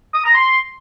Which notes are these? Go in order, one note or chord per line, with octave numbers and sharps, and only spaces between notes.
D#6
A#5
C6